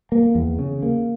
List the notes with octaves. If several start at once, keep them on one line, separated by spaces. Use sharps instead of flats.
A#3
E2
C#3
A#3